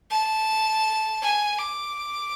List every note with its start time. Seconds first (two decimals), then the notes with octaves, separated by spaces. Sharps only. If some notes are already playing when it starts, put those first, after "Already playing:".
0.11 A5
1.23 G#5
1.59 D6